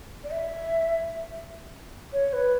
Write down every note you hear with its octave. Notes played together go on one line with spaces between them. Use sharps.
D5
E5
C#5
B4